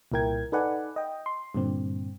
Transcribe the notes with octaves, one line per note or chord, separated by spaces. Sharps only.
C2 A#2 E4 A#4 G5 G#6
D#4 A4 B4 D5 F#5 G#5
D#5 G5
C6
G2 A#2 D3 C4